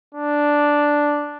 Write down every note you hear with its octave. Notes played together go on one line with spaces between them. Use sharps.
D4